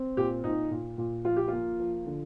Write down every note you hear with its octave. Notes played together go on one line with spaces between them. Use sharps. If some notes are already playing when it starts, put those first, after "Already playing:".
Already playing: C4
A#2 G4
A#2 D#4
A#2
A#2
F3 F4
G4
A#3 F4
F3
D3